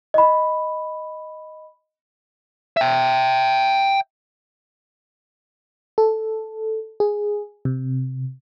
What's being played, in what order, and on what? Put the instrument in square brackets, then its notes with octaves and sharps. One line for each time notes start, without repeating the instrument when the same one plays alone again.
[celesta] D#5 B5
[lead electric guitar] E5 G5
[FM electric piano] A4
G#4
C3